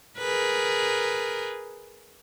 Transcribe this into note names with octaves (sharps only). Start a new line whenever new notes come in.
G#4 A#4 B4